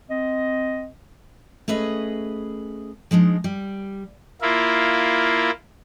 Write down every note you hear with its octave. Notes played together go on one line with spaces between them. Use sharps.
C4 D#5
A3 C#4 G#4 B4 D#5
F3 G#3 D4 D#4
G3
A#3 E4 F4